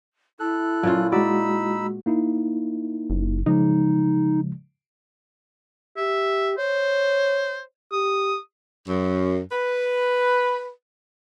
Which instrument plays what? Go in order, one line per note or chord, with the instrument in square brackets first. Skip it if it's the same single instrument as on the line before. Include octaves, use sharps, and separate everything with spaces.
[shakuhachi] E4 [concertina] A4 F#6
[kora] A#2 C#4 F4 [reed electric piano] F#3
[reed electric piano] G#3 F#4 [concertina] D#4 B5 E6 [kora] D5
[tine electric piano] A#3 D#4 E4
[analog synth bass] F#1
[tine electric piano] C#3 F3 G#3 [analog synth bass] D#4
[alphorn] G4 [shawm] E5
[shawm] C5 [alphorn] C#5
[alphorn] G4 [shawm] D#6
[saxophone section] F#2
B4